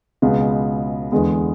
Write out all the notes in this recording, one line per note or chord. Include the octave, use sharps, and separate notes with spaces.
C#2 B2 G#3 B3
E2 D3 G#3 B3